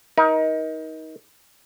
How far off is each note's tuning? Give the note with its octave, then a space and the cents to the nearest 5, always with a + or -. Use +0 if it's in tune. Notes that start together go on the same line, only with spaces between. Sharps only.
D#4 +25 A#4 +35